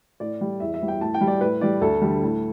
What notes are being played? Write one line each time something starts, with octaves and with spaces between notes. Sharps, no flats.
A2 D5
G3
E2 E5
E5
E3 G3
G5
A2 A5
G5
G3
D5
A2 B4
E3 G3 D5
D2 A4
D3 G3
A2